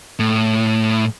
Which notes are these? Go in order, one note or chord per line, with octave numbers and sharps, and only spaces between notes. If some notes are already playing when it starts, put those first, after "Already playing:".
A2